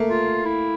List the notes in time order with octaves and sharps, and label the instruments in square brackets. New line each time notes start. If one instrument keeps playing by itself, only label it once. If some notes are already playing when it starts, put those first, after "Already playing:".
Already playing: [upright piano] A3 A#3
[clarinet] F4
E4